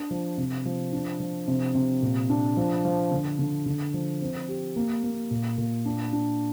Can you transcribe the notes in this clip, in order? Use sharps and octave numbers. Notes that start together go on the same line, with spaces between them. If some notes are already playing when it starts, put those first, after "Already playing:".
Already playing: D4
F3
C3
F3
D4
F3
C3
C3
A#2
D4
F3
F3
D3
D3
D3
F3
C4
G4
A#3
A#3
A#2
A#2
D4
D4